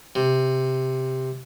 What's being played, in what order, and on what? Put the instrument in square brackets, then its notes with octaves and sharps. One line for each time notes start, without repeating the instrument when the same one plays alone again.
[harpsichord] C3